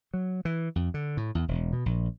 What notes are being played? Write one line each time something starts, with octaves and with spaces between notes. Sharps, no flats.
F#3
E3
F2
D3
A2
E2
E1
B2
A#1